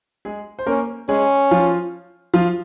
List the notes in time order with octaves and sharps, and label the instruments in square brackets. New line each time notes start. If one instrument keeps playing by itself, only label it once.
[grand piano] G#3 G#4
C5
[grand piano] A#3 A#4 [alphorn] C#4
[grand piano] G#3 G#4 [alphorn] C#4
[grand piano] F3 F4
F3 F4